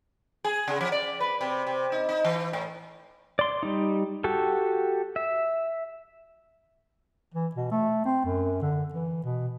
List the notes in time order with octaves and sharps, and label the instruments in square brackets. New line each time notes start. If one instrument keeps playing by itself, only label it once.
[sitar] G#4
C#3
F3
D5
B4
C3
C3
D#4
D#4
E3
A2
[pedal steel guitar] D5 C6
G3 D#4
F#4 G4 A4
E5
[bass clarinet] E3
B2
A3
C4
F#2
D3
E3
B2